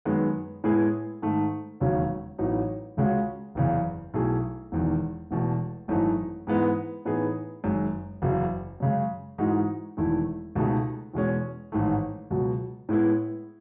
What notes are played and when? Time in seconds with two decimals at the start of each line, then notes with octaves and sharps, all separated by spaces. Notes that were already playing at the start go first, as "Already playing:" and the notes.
0.05 F#2 D#3 G#3 B3
0.64 A2 G#3 B3 E4 G#4
1.22 G#2 D#3 A3
1.80 E1 D#2 C#3 F#3 C#4
2.39 A1 A2 F#3 B3 D#4
2.97 C#2 C#3 G#3 C#4 F#4
3.55 F#1 E2 C#3
4.14 B1 B2 A3 E4 G#4
4.72 E1 E2 D#3
5.31 E1 E2 B2 A3
5.88 G#1 F#2 E3 A3 D#4
6.47 G#2 E3 G#3 B3 D#4
7.05 A2 E3 B3 D#4 G#4
7.64 F#1 F#2 D#3 G#3
8.22 F#1 E2 C#3 F#3
8.80 F#2 C#3 G#3
9.38 G#2 E3 G#3 D#4 F#4
9.97 E1 E2 D#3 A3 E4
10.55 C#2 B2 A3 D#4 G#4
11.14 E2 B2 G#3 C#4
11.72 A1 G#2 D#3 A3
12.30 C#2 B2 F#3
12.89 A2 G#3 B3 E4